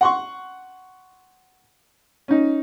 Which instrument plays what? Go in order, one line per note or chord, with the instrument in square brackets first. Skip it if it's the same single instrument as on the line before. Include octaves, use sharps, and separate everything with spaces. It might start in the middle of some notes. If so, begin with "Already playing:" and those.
[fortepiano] F#5 C6 C#6
C#4 D#4